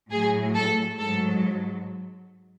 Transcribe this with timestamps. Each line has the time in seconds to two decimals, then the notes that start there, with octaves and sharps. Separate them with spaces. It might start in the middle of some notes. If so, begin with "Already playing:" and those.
0.11 A2 F#3 G#4
0.55 A4
0.99 G#2 F#3 A4